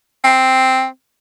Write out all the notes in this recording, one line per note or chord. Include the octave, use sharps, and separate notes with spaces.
C4